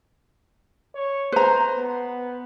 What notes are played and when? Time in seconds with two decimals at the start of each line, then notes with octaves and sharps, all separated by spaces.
0.95 C#5
1.32 B4 C5 A#5
1.76 B3